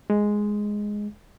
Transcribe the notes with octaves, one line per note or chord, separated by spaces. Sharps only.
G#3